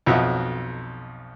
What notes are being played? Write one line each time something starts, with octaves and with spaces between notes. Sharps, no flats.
B1 F2 F#3 D#5 E5 F#5